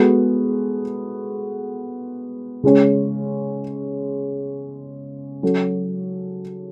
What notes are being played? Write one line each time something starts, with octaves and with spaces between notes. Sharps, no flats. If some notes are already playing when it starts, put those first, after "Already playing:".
Already playing: G#3 B3 F#4 A4
C#3 G#3 C#4
F#3 C#4 F#4 A4